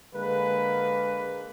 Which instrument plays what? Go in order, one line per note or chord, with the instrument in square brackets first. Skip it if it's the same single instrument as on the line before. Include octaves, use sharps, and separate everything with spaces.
[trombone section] D3 G#3 A#3 B4